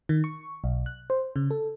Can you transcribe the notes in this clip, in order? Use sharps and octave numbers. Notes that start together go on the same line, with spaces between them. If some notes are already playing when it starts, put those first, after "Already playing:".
D#3
C#6
B1
F#6
C5
C#3
A4